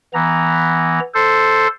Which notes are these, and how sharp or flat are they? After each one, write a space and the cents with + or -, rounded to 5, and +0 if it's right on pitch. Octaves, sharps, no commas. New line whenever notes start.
E3 +0 B3 +0 A#5 +0
A4 +0 C5 +0